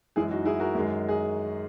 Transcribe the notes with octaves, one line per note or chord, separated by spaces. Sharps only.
F#2 E3 G#3 E4 G#4
D#4 F#4
E4 G#4
F#4 A#4
F#2 D#3 G#3
G#4